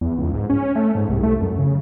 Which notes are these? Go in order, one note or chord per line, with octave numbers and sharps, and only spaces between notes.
E2
C#2
G#2
C#4
A3
G#2
C2
A3
F#2
C#3